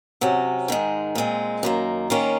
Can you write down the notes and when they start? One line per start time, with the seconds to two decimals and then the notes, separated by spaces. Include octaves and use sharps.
0.21 C3 F#3 C#4
0.68 G#2 D#3 G#3
1.15 A#2 G#3 C4
1.63 F#2 D#3 A#3
2.10 D#3 A#3 C#4 F4